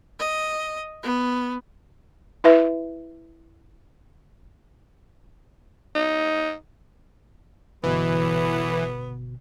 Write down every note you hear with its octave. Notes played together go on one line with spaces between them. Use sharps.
D#5
B3
E4 B4 E5
D#4
G1 B2 E3 B3